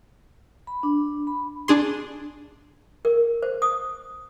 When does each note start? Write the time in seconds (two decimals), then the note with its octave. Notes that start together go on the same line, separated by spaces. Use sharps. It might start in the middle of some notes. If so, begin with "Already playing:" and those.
0.67 B5
0.83 D4
1.27 B5
1.68 D4 G#4 C6
3.05 A#4
3.43 C5
3.62 D#6